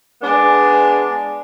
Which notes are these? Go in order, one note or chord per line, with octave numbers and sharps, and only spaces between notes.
G#3 B3 D4